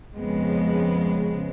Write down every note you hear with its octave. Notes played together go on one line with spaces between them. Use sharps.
F2 C#3 G#3 B3